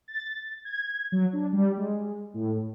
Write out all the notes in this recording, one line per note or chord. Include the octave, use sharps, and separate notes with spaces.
A6
G#6
F#3
D4
G3
G#3
A2